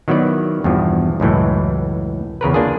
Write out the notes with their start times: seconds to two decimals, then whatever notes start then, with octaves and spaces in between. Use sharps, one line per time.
0.08 D#3 F#3 B3 E4 D5
0.64 E2 G2 B2 F3
1.20 C#2 F#2 A2 E3
2.41 E2 C#3 A#4 B4
2.54 A#3 D4 F4 G#4